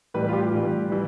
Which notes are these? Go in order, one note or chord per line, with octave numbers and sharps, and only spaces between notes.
A2 E3 G3 B4
F4
G4
A2 E3 G3
E3 G3